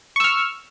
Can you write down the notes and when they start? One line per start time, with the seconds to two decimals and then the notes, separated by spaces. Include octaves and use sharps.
0.16 C#6
0.20 E6
0.24 F6